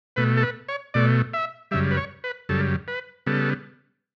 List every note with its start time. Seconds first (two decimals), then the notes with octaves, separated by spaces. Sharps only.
0.16 B2 A3 B4
0.37 A4
0.43 B4
0.69 C#5
0.94 B2 A3 D5
1.34 E5
1.71 F#2 C#3 G3 E5
1.91 B4
1.97 C#5
2.24 B4
2.49 F#2 C#3 G3 A4
2.88 B4
3.26 C#3 G3 B3 A4